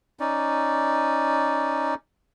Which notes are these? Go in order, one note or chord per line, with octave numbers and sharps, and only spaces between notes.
C#4 D#4 D5